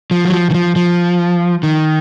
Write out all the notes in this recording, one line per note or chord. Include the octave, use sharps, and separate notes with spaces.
F3
F#3
F3
D#3
F3
F3
D#3